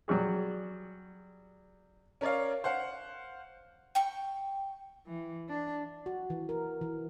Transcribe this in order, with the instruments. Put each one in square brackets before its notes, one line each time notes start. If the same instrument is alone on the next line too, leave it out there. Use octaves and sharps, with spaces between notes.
[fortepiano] F#3 G3 F#4 G#4
[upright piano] C#4 A#4 C#5 D5 F5
C5 F5 F#5
[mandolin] G5 C#6
[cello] E3
D4
[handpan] F#4
E3
A#4
E3